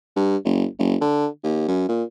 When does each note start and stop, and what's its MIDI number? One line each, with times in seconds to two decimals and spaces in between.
0.16 0.37 43
0.45 0.65 30
0.79 0.96 30
1.01 1.27 50
1.43 1.68 39
1.68 1.84 42
1.89 2.03 46